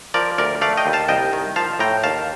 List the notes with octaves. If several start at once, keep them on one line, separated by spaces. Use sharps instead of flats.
F3 A#4 D5
D2 A#4 D5
A3 D5 F5
D#5 G5
D#2
F5 A5
C2 D#5 G5
D#3
F3 F5 A5
A2 G5 A#5
D#2 F5 A5